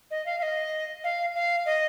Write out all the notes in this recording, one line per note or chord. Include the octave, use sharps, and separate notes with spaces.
D#5
F5
F5
D#5
F5
F5
D#5